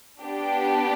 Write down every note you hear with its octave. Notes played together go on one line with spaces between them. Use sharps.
B3 D4 G4